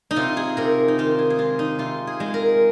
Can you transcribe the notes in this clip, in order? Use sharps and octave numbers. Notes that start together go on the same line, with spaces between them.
D#4
C3 F4
G#4
C3 A#4
D#4
D#3 F4
G#4
G#4
G#3 F4
D#4
C3 F4
G#4
G#3
A#4